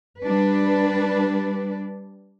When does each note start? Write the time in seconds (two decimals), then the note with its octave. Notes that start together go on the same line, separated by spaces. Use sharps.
0.20 G3 D4 B4